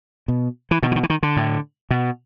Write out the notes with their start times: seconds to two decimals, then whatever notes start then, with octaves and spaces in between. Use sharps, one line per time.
0.28 B2
0.71 E3
0.83 B2 D#3
0.92 E3
0.96 D#3
1.03 E3
1.10 D#3
1.23 D3
1.37 A2
1.91 B2